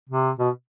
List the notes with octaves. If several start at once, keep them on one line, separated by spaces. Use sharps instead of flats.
C3
B2